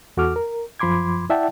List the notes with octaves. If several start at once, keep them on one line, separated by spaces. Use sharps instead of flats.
E2 F#4 A4 D6 F6
A#4
F#2 F3 B5 C6 D6 G#6
E4 D5 E5 F#5 G5 A5